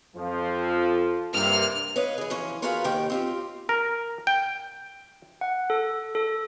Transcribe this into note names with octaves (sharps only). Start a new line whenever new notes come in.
F2 F3
G2 C3 A#3 F6
B4 C#5 D#5 F5
E3 G#4
E3 F3 C#4
F4 F#4 G#4 A#4 B4 F5
D#2 G4 G5
C4 F4 G4
A#4
G5
F#5
A4
A4